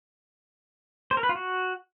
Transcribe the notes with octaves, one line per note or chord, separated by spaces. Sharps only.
C5
A#4
B4
F4
F#4